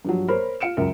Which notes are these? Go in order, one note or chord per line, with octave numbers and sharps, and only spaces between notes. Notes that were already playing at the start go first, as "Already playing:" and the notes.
G2 F3 F#3
A#4 C5 C#5 B5
F4 F5 C#7 D7 E7
C#2 F#2 A#4 E5